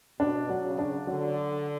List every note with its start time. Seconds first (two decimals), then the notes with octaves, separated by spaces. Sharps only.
0.20 B2 D4
0.49 F#3
0.64 C#3
0.79 D4
1.07 D3 F#3